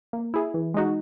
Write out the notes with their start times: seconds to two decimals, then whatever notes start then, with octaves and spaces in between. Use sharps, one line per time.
0.13 A#3
0.34 E4 G#4
0.54 E3
0.74 G#3 D#4 F#4